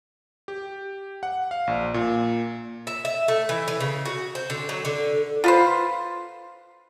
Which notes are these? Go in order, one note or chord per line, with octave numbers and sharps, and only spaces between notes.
G4
F#5
F5
A#1
A#2
E5
E5
A3
E3
E3
C#3
F#4
C5
D3
F#3
D3
F4 B4 C5